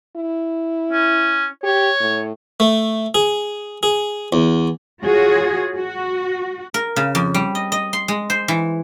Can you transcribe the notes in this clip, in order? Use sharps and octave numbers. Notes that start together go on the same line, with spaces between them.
E4
C#4
G4 C#5
A2
A3
G#4
G#4
E2
F4 F#4 G#4 C#5
F#4
A#4
C#3
F2
G3
D#5
D#5
C6
G#3
C5
E3